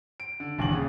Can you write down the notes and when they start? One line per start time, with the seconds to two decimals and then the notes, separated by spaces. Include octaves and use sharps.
0.20 D7
0.40 D3
0.58 D#1 E2 F#7
0.73 C#3